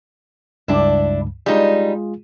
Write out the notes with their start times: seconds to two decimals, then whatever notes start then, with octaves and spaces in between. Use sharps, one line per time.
0.68 C#2 G2 D4 E4
1.46 G3 G#3 D#4 F4 G#4